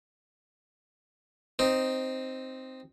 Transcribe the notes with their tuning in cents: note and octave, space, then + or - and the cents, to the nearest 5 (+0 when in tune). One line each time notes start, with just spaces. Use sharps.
C4 +0 D#4 +0